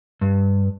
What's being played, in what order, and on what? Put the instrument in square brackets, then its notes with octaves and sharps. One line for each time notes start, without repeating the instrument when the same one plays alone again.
[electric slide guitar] G2